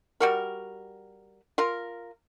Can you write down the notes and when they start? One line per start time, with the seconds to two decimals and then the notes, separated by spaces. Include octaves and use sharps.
0.20 G3 F#4 A#4
1.58 F4 A#4